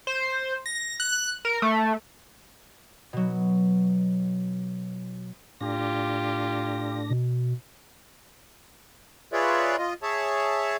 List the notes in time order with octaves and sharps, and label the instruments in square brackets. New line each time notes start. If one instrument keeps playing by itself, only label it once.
[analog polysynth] C5
A#6
F#6
A#4
A3
[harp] B2 F#3
[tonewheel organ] A2 D4 A#6 [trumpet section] F4 G4
[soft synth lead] B2
[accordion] F4 G#4 B4 C#5 D5 E5
F4 D#5
G#4 C#5 E5 A5